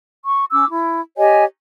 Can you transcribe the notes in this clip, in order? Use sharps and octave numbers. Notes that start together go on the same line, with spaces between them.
C#6
C#4 D6 E6
E4
G4 C#5 D#5 G#5